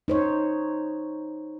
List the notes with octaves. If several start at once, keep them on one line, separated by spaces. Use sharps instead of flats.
D#4 C5 C#5